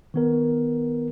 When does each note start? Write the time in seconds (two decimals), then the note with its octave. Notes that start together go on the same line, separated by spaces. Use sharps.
0.14 D#3 B3 A#4